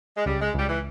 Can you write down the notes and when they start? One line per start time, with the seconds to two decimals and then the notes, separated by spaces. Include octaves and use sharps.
0.17 G#3
0.26 C#2 G3
0.41 G#3
0.54 C#2 G3
0.69 E3